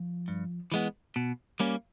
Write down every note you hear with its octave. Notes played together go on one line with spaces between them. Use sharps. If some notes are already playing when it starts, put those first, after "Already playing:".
Already playing: F3
G2
E3 G#3 B3
B2
G3 A#3 C#4